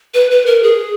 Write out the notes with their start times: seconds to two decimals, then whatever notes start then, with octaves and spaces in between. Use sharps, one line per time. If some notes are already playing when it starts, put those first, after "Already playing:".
0.14 B4
0.31 B4
0.46 A#4
0.63 G#4